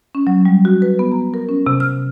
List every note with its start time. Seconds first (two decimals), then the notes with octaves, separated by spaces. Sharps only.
0.15 C#4
0.27 F#3
0.45 G3
0.65 F#4
0.82 B4
0.99 B3
1.12 A#5
1.34 A#4
1.49 C#4
1.67 C3
1.80 F6